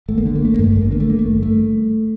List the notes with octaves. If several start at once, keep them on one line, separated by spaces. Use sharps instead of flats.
G#1 A3
A#3
D3 A3
A#3
G#1 A3
A#3
G2 A3
G#1 A#3
A3
D3 A#3
A3
G#1 A#3
A3
G2
A3